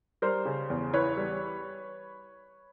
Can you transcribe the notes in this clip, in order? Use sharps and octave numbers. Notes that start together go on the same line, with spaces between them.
G3 A#4 C5
C#3
E2
E3 B4 C#5
G3